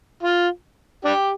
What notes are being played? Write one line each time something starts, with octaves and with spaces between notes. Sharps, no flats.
F4
D4 G4